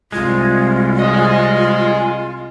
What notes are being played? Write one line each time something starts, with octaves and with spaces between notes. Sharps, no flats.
C2 G#3 F4
G#4 D#5